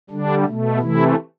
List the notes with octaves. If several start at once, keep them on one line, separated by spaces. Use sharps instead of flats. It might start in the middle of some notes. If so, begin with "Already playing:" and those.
D3 G3 D4
B2 A3
C3 E3 A3 E4